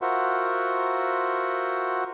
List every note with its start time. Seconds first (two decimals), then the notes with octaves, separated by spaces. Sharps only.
0.02 F4 F#4 A#4 C5 E5 F#5